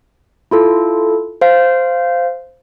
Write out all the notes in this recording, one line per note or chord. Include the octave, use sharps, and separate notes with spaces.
E4 F4 A4
C5 F5